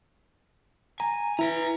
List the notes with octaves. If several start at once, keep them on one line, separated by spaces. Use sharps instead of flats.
G#5 A#5
E4 B4 A#5